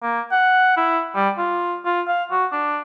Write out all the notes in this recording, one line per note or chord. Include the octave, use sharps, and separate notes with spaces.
A#3
F#5
E4
G3
F4
F4
F5
F#4
D4